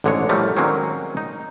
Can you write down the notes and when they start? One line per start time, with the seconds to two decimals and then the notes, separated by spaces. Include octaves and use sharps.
0.04 A1 G#2 D3 G#3 G#4 C#5
0.29 A2 F3 G3 A3 A#3
0.57 D#3 F#3 G#3 A#3 C4 C#4
1.17 D#4